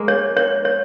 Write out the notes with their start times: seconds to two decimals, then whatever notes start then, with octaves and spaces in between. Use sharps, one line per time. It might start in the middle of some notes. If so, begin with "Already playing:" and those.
Already playing: G#3 A#3
0.08 C#5
0.37 C#5
0.65 C#5